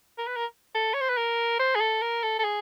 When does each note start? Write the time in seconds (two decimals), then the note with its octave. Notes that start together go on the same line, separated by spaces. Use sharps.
0.18 A#4
0.27 B4
0.36 A#4
0.75 A4
0.94 C#5
1.01 C5
1.09 B4
1.17 A#4
1.59 C5
1.75 G#4
1.81 A4
2.02 A#4
2.23 A4
2.39 A4
2.44 G#4